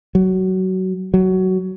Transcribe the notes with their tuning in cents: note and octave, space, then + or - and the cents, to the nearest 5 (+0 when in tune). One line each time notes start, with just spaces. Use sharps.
F#3 +20
F#3 +15